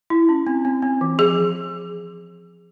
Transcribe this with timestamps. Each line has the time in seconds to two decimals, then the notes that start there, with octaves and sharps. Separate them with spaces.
0.10 E4
0.29 C#4
0.47 C4
0.65 C4
0.82 C4
1.01 E3
1.18 F3 G#4